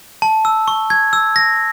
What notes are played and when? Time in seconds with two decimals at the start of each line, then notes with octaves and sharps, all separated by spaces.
0.22 A5
0.45 E6
0.68 C#6
0.90 G#6
1.13 E6
1.36 A#6